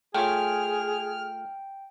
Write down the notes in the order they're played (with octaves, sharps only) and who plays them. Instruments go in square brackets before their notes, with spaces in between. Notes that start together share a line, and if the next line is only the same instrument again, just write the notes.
[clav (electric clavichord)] A3 F4 C#5 [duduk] G#4 [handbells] G5 [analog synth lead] F6